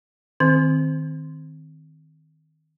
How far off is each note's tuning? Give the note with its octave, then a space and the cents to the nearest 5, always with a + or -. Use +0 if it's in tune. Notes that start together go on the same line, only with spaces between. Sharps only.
D#3 +0 C4 +0